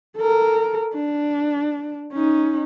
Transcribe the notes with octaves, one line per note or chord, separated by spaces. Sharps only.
A4 A#4
D4
C#4 D#4